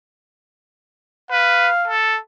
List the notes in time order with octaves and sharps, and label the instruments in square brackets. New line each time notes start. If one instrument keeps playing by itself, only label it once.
[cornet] B4 [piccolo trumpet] F5
[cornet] A4